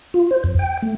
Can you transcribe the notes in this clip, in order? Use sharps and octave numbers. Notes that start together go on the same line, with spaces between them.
F4
C5
F2
G5
A3